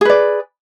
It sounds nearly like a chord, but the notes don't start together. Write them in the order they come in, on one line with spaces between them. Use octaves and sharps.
G#4 B4 D5